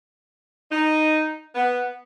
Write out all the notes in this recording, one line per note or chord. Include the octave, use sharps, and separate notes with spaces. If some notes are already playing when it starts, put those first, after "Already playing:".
D#4
B3